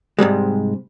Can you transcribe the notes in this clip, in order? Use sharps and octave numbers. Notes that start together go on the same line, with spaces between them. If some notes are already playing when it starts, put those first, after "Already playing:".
G#2 C3 G3 G#3